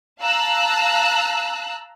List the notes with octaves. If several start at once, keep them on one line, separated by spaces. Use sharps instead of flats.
F5 A5 A#5 E6 F#6